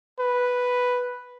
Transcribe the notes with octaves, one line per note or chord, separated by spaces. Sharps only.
B4